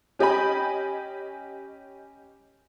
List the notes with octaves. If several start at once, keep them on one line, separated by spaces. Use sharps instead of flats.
C#4 G4 D#5 G#5 B5